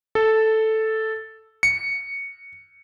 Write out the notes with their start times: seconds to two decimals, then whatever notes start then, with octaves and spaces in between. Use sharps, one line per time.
0.15 A4
1.63 C#7